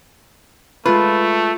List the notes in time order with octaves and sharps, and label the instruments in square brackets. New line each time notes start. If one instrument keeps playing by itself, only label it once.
[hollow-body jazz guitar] G#3 B4 [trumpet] A3 [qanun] F4